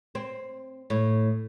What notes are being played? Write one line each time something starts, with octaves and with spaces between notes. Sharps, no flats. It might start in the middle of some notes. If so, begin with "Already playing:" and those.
C4
A2